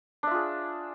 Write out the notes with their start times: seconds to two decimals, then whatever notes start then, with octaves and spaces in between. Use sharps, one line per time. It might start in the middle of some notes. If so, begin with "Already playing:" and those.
0.23 D4
0.27 E5
0.31 F4
0.35 G#4